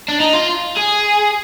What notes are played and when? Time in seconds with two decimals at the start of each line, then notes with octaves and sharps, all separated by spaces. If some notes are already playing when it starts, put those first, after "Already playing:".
0.08 D4
0.20 D#4
0.33 F4
0.76 G#4